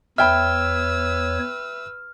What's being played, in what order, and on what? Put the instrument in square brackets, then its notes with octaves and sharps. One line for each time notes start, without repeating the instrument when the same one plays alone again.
[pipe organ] E2 C#5 [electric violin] B4 E6 [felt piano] E5 G5 B5 [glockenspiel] F6